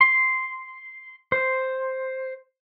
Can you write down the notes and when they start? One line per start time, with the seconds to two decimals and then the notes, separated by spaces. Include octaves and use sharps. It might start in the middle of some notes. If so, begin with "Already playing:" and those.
0.01 C6
1.32 C5